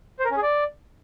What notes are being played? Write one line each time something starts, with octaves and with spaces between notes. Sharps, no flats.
C5
A#4
C#4
G#4
D5